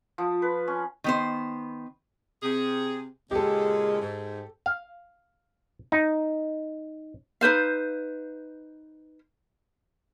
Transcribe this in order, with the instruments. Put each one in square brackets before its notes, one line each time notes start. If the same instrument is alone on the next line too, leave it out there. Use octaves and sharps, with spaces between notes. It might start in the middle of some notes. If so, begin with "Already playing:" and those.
[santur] F3
B4
C#4
[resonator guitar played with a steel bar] D#3 B3 C5
[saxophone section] C3 G#4
[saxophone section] A#2 C#3 G#3 [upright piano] G4 A4
[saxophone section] G#2
[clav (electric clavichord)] F5
D#4
[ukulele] D#4 B4 C5 F5